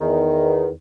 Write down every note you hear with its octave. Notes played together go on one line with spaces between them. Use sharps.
E2 D#3